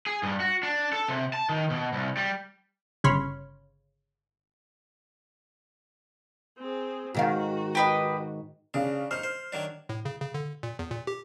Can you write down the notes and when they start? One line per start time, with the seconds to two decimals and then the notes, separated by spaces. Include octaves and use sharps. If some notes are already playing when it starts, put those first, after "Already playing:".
0.07 G#4
0.23 G2
0.40 F#4
0.63 D4
0.93 A4
1.08 C3
1.33 A5
1.49 D#3
1.70 B2
1.93 C2
2.17 G3
3.04 G1 C#3 C#5 B5 C6 F6
6.58 C4 G#4
7.14 G#2 D#3 F#4 F5
7.75 G4 B4 D#5
8.74 C#3 D4 F5
9.11 D#4 C5 F6
9.23 C5
9.52 D#3 F#3 D4
9.89 A2
10.05 C#3
10.21 C#3
10.34 D3
10.63 A#2
10.79 E2
10.91 A#2
11.07 G4